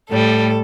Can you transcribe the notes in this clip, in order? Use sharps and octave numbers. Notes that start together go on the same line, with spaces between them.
A2 G3 A4